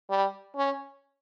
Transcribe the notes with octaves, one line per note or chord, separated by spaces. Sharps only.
G3
C#4